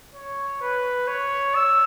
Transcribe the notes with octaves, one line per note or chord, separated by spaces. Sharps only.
C#5
B4
C#5
E6